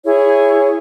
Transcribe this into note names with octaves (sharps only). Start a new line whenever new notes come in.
E4 G#4 C#5